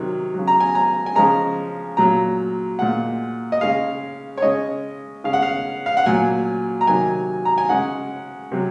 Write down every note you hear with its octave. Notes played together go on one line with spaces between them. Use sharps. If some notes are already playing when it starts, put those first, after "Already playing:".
Already playing: C3 D#3 F#3
C#3 F#3
A#5
G#5
A#5
G#5
C#3 F3 G#3 A#5
A#2 F#3 A#5
A#2 G#3 F#5
D#5
C#3 G#3 F5
C#5
C#3 G#3 D#5
C#3 G#3 F5
F#5
F5
F5
F#5
A#2 F#3 G#5
A#5
C3 D#3 F#3 G#5
A#5
G#5
C#3 G#3 F#5
C3 F#3